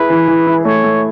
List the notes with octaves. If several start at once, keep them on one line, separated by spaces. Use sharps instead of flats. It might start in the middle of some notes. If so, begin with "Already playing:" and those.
Already playing: E4 G#4 B4
E3
E3
E4
A3 C#5
A3